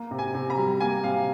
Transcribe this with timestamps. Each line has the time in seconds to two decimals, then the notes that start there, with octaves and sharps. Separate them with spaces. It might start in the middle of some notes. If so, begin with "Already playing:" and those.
Already playing: A#3
0.11 C3
0.19 G#5
0.34 C3
0.50 A#5
0.58 G3
0.80 A#3 G#5
1.04 C3 F5